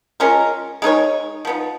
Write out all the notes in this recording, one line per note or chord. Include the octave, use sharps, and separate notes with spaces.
G#3 C#4 F4 A#4
G#3 D#4 A#4 C#5
F3 B3 D#4